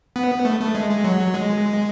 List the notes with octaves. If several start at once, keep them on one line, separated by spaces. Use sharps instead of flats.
B3
A3
A3
G#3
G#3
F#3
G#3